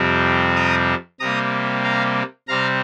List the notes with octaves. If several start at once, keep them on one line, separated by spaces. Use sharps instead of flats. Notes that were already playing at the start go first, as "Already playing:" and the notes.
Already playing: F2 C3 G3 C4
A#5 D#6
C3 G3 A#3 A#5 D#6
F5 A#5
C3 G3 C4 F5 A#5